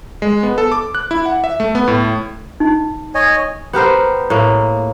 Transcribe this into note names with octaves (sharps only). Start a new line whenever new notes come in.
G#3
B3
A4
D6
F#6
E4
F#5
E5
A3
B3
A2
D#4
C#5 D#5 G#5
B3 G4 A#4 C5
A2 A#3